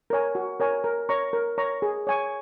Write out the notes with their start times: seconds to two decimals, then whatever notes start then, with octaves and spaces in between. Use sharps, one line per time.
0.10 A#4 C#5 G#5
0.35 F#4
0.60 A#4 C#5 G#5
0.84 A#4
1.09 C#5 A#5 C#6
1.33 A#4
1.58 C#5 A#5 C#6
1.82 G#4
2.07 C#5 G#5 C#6